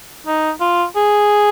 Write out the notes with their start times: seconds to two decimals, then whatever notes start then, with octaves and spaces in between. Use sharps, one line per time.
0.27 D#4
0.60 F4
0.96 G#4